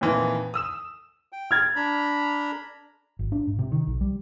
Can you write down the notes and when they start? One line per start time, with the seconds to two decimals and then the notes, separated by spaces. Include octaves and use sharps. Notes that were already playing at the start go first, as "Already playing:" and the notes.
0.01 F2 A#2 D#3 E3
0.54 D#6 E6 E7
1.32 G5
1.51 F6 G#6 A6
1.76 D4 A#5 B5
3.19 G#1
3.32 D4
3.47 G#2
3.59 C3
3.72 D#3
3.87 B1
4.01 G3